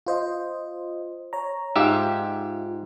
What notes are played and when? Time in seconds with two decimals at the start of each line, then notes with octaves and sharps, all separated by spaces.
0.07 F4 C5 D#5
1.33 C#5 A#5
1.76 G#2 D#4 F4 G4 E5